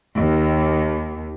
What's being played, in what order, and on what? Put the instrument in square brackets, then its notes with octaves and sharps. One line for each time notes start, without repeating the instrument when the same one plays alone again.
[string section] D#2